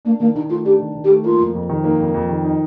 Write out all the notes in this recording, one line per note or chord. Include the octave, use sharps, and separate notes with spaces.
A#3 D4
D#3 A#3
D#3 D#4
A3 F4
D4 G4
D#3
D#3
G4
A3
A#3 F4
F2
F2
D#3
A#3 D#4
F2
F2
D#3
D#4